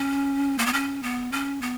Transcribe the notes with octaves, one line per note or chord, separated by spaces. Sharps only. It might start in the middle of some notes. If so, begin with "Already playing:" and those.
Already playing: C#4
A#3
B3
C#4
B3
C#4
B3